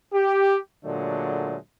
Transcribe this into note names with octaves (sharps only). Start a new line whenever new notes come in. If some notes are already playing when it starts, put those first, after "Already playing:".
G4
A#2 D3 F#3 G#3 A3